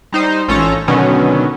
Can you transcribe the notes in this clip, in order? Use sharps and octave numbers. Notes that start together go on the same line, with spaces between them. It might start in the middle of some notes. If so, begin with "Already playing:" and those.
G3 D#4 C5
A1 C#4 F4 A4 C#5 A#5
B2 D3 D#3 F#3 B3 C#4